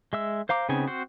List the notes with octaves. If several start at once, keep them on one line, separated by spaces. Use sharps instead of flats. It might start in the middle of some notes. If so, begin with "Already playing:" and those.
G#3 E5 E6
C5 F5 A#5 D6
C#3 B3 C4 D#4 G#5
C4 F#4 C5